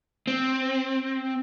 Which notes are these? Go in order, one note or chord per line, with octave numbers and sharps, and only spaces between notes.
C4